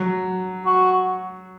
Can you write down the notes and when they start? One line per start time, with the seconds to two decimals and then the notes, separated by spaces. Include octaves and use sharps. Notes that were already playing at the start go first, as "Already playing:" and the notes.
Already playing: F#3
0.66 F#4